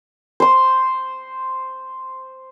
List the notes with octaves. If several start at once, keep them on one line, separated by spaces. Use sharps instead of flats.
C5 C6